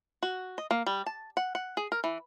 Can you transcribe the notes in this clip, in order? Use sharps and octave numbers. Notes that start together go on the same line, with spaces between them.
F#4
D#5
A#3
G3
A5
F#5
F#5
G#4
A#4
E3